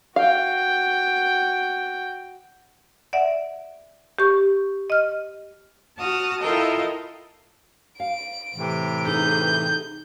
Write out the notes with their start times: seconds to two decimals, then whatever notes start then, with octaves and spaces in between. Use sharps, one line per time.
0.16 F#4 F5 G5
3.13 D5 E5 F#5
4.19 G4 C#6
4.90 D#5 F6
5.98 F#4 A5 D#6 F6
6.40 E4 F4 A4 A#4 D#5 G5
8.00 F5 D7
8.55 A2 C3 E3
9.06 D#4 G#4 A4 G6